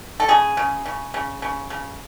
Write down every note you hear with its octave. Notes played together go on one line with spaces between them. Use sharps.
A4
C#3 G#4
C#3
C#3
C#3
C#3
C#3